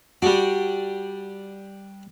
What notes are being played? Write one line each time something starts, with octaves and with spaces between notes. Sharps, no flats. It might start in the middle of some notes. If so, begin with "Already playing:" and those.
G3 D4 F#4